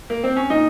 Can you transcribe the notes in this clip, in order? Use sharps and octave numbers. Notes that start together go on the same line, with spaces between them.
A#3
C4
C#4
A#2 D#4